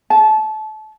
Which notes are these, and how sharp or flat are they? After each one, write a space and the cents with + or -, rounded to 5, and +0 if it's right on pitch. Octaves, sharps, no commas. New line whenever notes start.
A5 -25